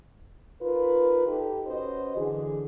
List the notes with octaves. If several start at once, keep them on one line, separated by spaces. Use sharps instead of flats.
D#4 F4 A#4 B4
D#4 G4 A4
C#4 F#4 B4 C5 D#5
D3 E3 G#4